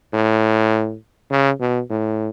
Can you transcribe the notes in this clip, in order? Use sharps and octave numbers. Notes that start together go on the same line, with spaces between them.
A2
C#3
B2
A2